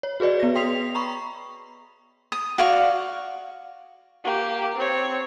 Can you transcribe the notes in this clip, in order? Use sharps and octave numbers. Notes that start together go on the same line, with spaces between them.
C#5
F#4 G#4 B4 D5 D#5
B3 A#6
G5 C6 D#6 B6 C7 F7
A#5 B5 C#6
D#6
F#4 D5 F5 C#6
A#3 G4
C4 C#5